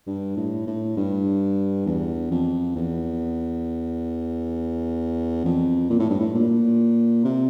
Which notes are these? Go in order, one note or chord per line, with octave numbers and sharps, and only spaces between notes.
G2
A2
A2
G2
E2
F2
E2
F2
A#2
A2
G2
A2
A#2
C3